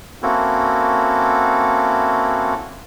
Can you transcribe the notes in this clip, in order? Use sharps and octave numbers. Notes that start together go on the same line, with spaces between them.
A#3 C4 C#4 E4 F#4 A4